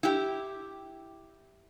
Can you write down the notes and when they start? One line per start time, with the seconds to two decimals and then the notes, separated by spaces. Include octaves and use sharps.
0.03 E4 G4